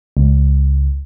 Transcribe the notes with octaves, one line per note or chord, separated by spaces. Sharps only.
C#2